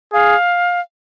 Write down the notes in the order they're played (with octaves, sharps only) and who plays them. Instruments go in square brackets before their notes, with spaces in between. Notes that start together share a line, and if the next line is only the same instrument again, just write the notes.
[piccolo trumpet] G#4 [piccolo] F5